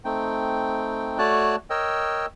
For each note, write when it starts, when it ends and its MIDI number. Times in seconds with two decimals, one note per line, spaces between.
0.05 1.18 57
0.05 1.18 60
0.05 1.18 63
0.05 1.18 79
1.18 1.56 57
1.18 1.56 66
1.18 1.56 73
1.18 1.56 74
1.18 1.56 81
1.18 1.56 90
1.70 2.26 70
1.70 2.26 73
1.70 2.26 75
1.70 2.26 79
1.70 2.26 88